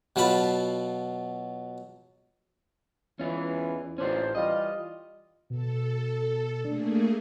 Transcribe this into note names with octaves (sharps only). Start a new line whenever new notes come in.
B2 F#3 F4 A5 B5
E2 E3 C#4 F4
A1 C#4 D4 F4 C5
E3 G3 F4 D#5
B2 A4
A3 A#3 D4 G#4